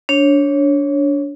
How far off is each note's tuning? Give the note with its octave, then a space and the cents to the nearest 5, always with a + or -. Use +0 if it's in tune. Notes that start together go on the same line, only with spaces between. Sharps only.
D4 -25 C#5 -15